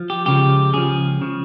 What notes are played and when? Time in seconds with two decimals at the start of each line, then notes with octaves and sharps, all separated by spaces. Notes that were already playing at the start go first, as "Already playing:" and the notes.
Already playing: F3
0.10 G4
0.26 C#2 C#3 F3 G4
0.73 C#2 C#3 F3 G#4
1.21 C#3 F3